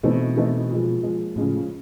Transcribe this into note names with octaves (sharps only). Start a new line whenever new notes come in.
B2 E3 A3 C4 D#4
E3 A3 C4 D#4
A#2 F3 G#3
A#2 F3 G#3
A2 C#3 F3 G#3 C#4